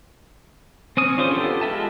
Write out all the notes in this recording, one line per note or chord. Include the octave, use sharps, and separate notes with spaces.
C4 C#4 D#6
C#4 D4 F4 G#4 C5
B3 F4 G4 A4
G#3 F4 E5 A5